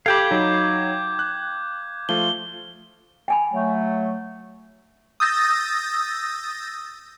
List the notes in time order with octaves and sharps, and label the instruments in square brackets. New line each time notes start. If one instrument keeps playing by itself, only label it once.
[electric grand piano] G4 A4 [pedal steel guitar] F5 G5 B5 [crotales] D6 G6 G#6
[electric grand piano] F#3 D#4
F#6
[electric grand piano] F3 A3 F4 [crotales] G7
[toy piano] G5 G#5 B5
[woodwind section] F#3 A3
[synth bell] D#6 E6 G6 A6 A#6